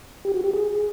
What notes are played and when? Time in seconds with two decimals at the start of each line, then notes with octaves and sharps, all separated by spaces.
0.25 G4
0.34 F#4
0.44 G4
0.53 G#4